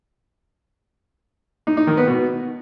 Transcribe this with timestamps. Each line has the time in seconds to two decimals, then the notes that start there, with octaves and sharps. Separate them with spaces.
1.67 D#4
1.77 D#4
1.87 D#3
1.97 B3
2.07 B2